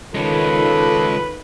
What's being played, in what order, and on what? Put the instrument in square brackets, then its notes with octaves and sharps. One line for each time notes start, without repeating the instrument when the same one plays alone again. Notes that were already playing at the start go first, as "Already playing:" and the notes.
[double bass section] D#3 [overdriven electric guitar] G#3 C#4 [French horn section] F4 A4 [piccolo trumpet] B4